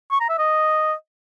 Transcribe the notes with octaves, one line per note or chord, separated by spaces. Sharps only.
C#6
A#5
E5
D#5